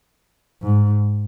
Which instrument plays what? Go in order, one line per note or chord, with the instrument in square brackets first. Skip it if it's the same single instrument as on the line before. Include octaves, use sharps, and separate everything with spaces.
[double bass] G#2